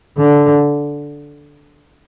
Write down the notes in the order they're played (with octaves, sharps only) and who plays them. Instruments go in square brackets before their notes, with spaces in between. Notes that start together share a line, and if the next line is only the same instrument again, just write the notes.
[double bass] D3